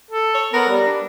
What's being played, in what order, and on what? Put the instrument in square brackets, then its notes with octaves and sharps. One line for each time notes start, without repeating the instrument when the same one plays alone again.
[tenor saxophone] A4
[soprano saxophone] C#5
[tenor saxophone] B3 [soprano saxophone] A#4
[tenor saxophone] G3
[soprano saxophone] D4